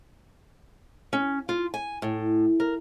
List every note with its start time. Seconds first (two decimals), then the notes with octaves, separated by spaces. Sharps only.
1.13 C#4
1.49 F4
1.74 G#5
2.02 A2
2.60 A#4